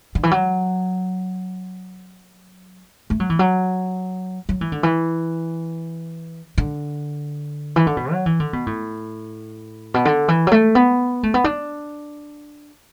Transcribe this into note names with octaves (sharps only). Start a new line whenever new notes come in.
D3
E3
F#3
A3
F#3
E3
F#3
F#3
E3
D3
E3
D3
E3
D3
B2
F#3
E3
D3
B2
A2
B2
D3
E3
F#3
A3
B3
A3
B3
D4